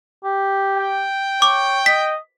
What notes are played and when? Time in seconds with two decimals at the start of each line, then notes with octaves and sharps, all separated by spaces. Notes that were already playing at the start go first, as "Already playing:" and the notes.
0.24 G4
0.76 G5
1.42 C#5 D6
1.86 D#5 B6